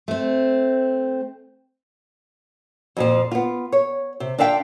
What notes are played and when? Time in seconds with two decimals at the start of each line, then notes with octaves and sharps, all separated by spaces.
0.08 A3 C4
2.97 F2 A#2 F3
3.32 B3 F4
3.72 C#5
4.20 C3
4.38 D4 F4 E5 F5 G5